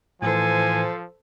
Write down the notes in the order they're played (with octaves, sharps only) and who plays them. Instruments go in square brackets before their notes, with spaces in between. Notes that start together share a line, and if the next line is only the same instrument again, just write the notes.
[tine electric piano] A2 E3 [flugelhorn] F3 [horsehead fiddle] A4 C5 [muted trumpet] G#5